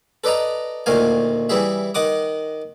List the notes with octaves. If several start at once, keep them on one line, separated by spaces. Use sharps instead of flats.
A4 B4 D5 D#5 A#5
D2 A#2 D#3 A3 F5 G#5
E3 G3 E4 G#4 E5
D#3 D#5 F#5 D6 D#6